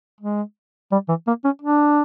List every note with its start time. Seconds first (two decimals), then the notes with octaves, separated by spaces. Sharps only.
0.21 G#3
0.92 G3
1.08 E3
1.27 A#3
1.44 C#4
1.62 D4